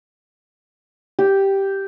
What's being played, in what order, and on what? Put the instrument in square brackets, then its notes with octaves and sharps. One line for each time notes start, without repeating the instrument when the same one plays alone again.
[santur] G4